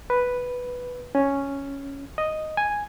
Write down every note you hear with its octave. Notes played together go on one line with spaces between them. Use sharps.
B4
C#4
D#5
G#5